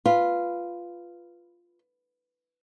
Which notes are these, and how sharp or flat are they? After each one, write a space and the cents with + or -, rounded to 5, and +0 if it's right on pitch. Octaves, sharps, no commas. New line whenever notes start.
F4 -5 B4 +0